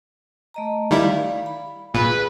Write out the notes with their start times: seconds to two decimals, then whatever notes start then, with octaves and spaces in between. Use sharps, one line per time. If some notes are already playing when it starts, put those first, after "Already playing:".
0.54 A3 D#5 A#5
0.91 D#3 G3 E4 D5 F5
1.46 B5
1.95 A#2 G#4 B4